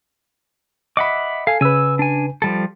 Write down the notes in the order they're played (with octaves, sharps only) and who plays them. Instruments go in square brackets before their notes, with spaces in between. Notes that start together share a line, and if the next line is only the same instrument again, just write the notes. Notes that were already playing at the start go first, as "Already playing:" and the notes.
[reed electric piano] D#5 B5 [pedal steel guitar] E5 F#5 D6
[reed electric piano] A4 G#5 [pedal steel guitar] F5
[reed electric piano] C#3 B4 [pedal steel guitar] G#5 E6
[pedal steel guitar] D4 G#5
F3 G3 A4